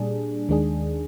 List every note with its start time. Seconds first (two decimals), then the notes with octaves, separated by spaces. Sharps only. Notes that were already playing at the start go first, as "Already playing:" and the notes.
Already playing: A#2 G3 D4 G#4
0.49 D#2 D#3 G#3 D4 G#4